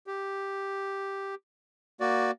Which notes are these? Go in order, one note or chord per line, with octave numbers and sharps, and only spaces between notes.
G4
A#3 F#4 D5